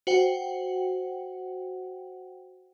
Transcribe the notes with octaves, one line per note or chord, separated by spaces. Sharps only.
F#4 C5 F#5 G5